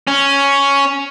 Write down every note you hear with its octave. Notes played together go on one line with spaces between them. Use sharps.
C#4